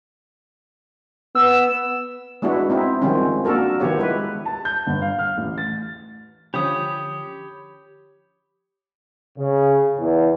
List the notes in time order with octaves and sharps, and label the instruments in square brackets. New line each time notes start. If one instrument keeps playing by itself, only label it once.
[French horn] B3 [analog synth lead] E6
[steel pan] G#3 B3 D4 E4 F#4
C4 D#4 E4
D#3 F3 G3 G#3 C4 C#4
A#3 D4 F#4 A4 A#4
D#3 F3 B3 G4 C#5
G#3 E4 B4
[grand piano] A5
G6
G1
F5
F6
A1
A6
[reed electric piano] D3 F3 C#4 [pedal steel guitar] G4 D#6 [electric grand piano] C#5 B5
[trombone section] C#3
E2